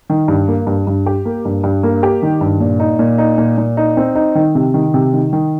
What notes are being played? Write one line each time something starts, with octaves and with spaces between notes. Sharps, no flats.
D#3
G2
A#3
G2
G2
G4
A#3
G2
G2
A#3
G4
D#3
G2
A#2
D#4
A#2
D#4
A#2
A#2
D#4
C4
D#4
D#3
C3
D#3
C3
D#3
D#3